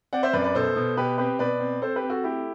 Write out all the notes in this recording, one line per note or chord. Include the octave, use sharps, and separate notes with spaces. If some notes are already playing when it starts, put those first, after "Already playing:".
C4 D5 F#5
C5 E5
F#2 B4 D5
B4 D5
B2 A4 C5
B2
B2 G4 B4
C4 G4 B4
B2 B4 D5
C4
C4 A4 C5
G4 B4
C4
F#4 A4
A3 E4 G4